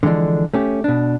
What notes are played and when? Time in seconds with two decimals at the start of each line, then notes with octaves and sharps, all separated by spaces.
0.03 D3 E3 F3 G#3 D4
0.54 A3 C#4 G4
0.84 B2 D4